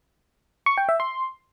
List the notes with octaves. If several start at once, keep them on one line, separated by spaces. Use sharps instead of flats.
C#6
G5
E5
C6